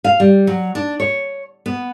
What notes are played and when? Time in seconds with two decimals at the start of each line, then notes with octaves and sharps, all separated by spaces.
0.04 F5
0.20 G3
0.47 F#3
0.75 D4
1.00 C#5
1.66 B3